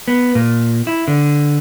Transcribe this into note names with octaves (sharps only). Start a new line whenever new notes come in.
B3
A#2
E4
D3